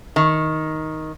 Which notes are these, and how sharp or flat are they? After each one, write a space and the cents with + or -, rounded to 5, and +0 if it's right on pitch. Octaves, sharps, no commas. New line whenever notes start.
D#3 +10